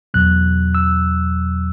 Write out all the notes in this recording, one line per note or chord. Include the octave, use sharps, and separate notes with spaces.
E2 B2 F#3 F#6
E6